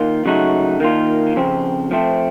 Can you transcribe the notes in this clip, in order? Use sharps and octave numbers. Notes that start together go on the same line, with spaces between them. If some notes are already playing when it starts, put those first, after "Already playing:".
Already playing: D#3 A#3 F4
C#3 F#3 A3 D#4 F#4
D#3 A#3 F4
F2 C#3 F3 C4
F3 A3 C4